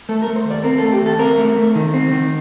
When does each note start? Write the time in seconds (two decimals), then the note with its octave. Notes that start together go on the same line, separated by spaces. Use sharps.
0.09 A3 A4
0.22 A#4
0.27 A3
0.36 C5
0.45 D#2
0.50 D5
0.64 C4 A#4
0.78 A4
0.82 A3
0.92 G4
1.02 D#2 A4
1.19 C4 A#4
1.38 A3
1.56 A3
1.75 D#3
1.94 C4
2.11 D#3